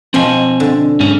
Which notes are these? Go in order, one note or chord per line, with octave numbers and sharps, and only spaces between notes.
B2 F3 C4 G#5
D3
G#2 C#4